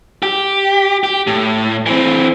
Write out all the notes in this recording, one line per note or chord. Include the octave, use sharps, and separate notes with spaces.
G4
G4
A2
E3 C4